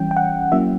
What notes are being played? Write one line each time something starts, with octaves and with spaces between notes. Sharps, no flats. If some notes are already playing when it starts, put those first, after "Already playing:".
Already playing: E3 G3 C#4 G5
G5
F#5
F#3 A#3 C#4 E4 E5